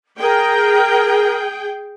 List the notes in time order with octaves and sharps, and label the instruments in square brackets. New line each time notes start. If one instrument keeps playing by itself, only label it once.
[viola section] G#4 G5 [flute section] A#4